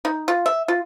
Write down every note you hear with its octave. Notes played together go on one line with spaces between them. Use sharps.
D#4
F4
E5
F4